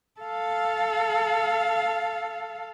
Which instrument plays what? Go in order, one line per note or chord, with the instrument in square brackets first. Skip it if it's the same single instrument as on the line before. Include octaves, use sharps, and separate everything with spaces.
[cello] A4 F5